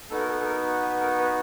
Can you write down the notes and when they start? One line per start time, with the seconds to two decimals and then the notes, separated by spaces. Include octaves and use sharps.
0.10 B3 D#4 F#4 A4
0.19 A#4
0.28 A4
0.41 A4
0.45 A#4
0.82 B4
1.00 A#4
1.18 B4